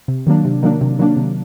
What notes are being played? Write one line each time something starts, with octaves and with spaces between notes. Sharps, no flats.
C3
D#3 F#3 A#3 D4
C3
D#3 F#3 A#3 D4
C3
D#3 F#3 A#3 D4
C3